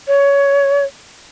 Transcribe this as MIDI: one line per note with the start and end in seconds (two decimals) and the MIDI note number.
0.08 0.84 73